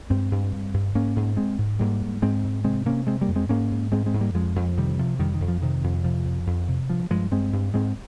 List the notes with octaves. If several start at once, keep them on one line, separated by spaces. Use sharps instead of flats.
G2 G#3 C4
G2
G2
G2
G#2 A#3 C#4
G#2
G#2 G#3 C4
G#2
G#2 G3 A#3
G#2
G#2 G#3 C4
G#2
C3 G#3 C4
C3 A#3 C#4
C3 G#3 C4
G3 A#3
F2
G#3 C4
G#2 A#3 C#4
G#2
G#2 G#3 C4
G#3 C4
G#2
G3 A#3
F2 F3 G#3
F2
C3 D#3 G3
C3 F3
F2 D#3 G3
D#3
F2
F3
C3 D#3
F2
C3 F3
F2
F2
C3
G2 F3
G2 F3 G#3
G2 G#3 C4
G2
G#2 G#3 C4